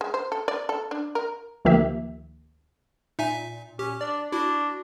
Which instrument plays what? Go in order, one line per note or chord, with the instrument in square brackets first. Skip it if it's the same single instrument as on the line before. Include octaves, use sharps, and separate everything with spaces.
[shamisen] G#3
C5
A4
D5
A4
D4
A#4
[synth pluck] D2 D#3 F3 A#3 G4 E5
[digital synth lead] A#2 [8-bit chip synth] D#4 E5 G#5
[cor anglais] C#4 [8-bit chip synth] G4
[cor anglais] D4 [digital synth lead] D5
[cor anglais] D4 [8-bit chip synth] E4 [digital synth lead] F#4